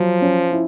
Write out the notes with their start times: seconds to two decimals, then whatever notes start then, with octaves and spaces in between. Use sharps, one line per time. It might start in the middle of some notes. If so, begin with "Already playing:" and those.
Already playing: F3 F#3
0.21 C#4
0.52 E4